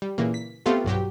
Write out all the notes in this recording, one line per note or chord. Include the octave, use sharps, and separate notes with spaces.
G3
A#2 C#3 E3 A#3
B6
A3 B3 C4 F4 G4 A4
B1 G2 F#3 G4